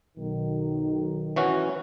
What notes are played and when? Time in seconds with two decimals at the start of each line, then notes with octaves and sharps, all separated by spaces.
0.18 B1 D#3
1.36 E3 C#4 F#4